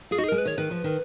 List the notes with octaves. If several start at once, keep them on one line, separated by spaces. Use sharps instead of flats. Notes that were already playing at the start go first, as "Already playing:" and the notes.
F4 G#4
D#4 F#4
G#4
G#3 A#4
B4
D#3 C#5
D#3 B4
F3
D#3